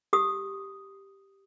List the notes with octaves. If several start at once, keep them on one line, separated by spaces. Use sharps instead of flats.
G4 D#6